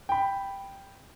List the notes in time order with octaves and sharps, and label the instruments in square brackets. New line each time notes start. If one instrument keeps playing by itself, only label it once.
[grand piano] G5 B5